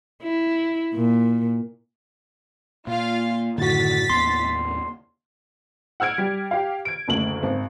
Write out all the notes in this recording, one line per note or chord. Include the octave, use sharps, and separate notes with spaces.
E4
A#2
A#2 F4 F5
F#2 A2 D3 D#3 F#4 A6 B6
D#2 A2 B3 C6
F#5 E6 F6 G#6 D7
G3
G4 F5
G#6 D7
F#1 D2 F#7
G#1